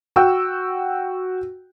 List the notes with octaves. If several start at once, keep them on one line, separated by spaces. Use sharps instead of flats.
F#4 G5 E6